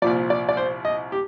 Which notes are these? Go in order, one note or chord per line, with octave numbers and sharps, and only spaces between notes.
C2 A#2 F3 D5
D5
D5
C5
D#5
G4